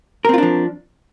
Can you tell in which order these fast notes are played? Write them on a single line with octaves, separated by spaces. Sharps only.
A#4 C4 F4 D4 F3